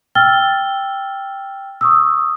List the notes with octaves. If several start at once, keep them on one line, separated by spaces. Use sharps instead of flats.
G5 E6 F6 A6 G7
C#6 D#6 E6